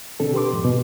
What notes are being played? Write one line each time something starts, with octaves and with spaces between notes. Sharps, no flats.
B2 D3 C4 D4 A4
G4 B4 C6 D6
F2 G#2 B2
B2